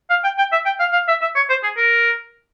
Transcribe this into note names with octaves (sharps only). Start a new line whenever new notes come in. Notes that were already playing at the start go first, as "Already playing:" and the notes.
F5
G5
G5
E5
G5
F5
F5
E5
E5
C#5
C5
G#4
A#4